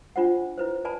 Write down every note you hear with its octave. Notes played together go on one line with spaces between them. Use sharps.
D4 F4 C5 F#5
E4 B4 C5
B4 D5 G#5 A5 B5